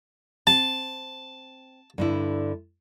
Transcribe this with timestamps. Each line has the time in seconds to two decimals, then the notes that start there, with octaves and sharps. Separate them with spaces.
0.47 C4 A5
1.98 G2 D3 E4